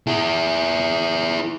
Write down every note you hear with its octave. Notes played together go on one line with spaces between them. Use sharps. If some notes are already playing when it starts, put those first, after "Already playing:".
E4 G#4